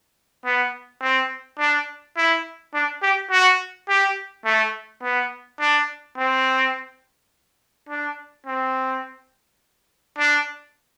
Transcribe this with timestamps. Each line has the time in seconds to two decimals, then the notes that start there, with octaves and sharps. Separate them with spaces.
0.45 B3
1.01 C4
1.59 D4
2.17 E4
2.74 D4
3.02 G4
3.31 F#4
3.89 G4
4.45 A3
5.03 B3
5.60 D4
6.17 C4
7.89 D4
8.47 C4
10.18 D4